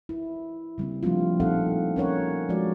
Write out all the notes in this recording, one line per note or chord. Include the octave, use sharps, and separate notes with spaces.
E4
C#3 G3 A#3 C4
F3 G3 A3 C4 D4 F4
A#2 C4 D#4 A4 F5 F#5
C#4 A#4 C#5 F#5
F3 G#3 F#4 D5